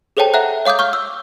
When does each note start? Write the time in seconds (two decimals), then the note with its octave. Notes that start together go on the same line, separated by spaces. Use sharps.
0.17 G#4 A4 C5 C#5 G5 A5
0.34 E5 F#5 A#5 F#6
0.65 C#5 F5 D6 D#6 G6
0.79 C#6 F6 G6
0.93 E6